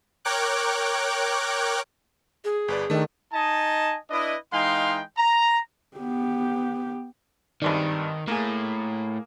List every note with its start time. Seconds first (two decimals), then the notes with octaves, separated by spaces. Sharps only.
0.25 A#4 C#5 G5 D6 F#6
2.45 G#4
2.68 G1 B4 D5
2.90 D#3 A3 D4
3.33 D#4 D#5 G#5 A5
4.10 D4 E4 B4 D#5
4.52 E3 G#3 D#4 F5 G5 C6
5.17 A#5
5.98 B3 G4
7.62 G#1 G2 D#3 D4
8.28 A2 A#3 G#4